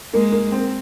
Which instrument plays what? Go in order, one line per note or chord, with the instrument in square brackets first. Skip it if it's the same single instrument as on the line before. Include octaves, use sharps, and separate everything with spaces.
[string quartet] G#3 [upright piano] A#3
[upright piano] A#3
C4